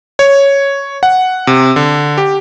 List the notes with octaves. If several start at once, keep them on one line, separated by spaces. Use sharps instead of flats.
C#5
F#5
C3
D3
G4